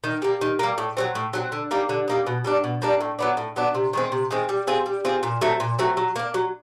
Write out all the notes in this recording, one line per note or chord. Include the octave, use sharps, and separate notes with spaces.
D#3
G3 A#3
D#3
G3 A#3
A2
F#3 A3 C4
A2
F#3 A3 C4
D3
G3 A#3 D#4
D3
G3 A#3 D#4
B2
G3 A#3 D4
B2
G3 A#3 D4
A2
F#3 B3 D4
A2
F#3 B3 D4
C3
D#3 G#3 C4
C3
D#3 G#3 C4
G3
C4 F4 G#4
G3
C4 F4 G#4
A#2
F#3 A3 C4
A#2
F#3 A3 C4
F#3
A#3 D4
F#3